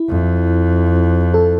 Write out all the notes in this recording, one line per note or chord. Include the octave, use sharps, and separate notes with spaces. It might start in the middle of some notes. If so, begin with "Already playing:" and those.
Already playing: E4
F2
A4